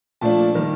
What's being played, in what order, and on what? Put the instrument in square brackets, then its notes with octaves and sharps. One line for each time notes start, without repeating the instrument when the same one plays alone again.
[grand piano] A#2 F3 A3 D4 F4 A5
D#3 G3 A#3